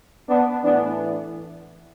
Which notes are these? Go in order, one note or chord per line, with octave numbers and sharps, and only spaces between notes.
B3 D4
A2 E3 B3 D4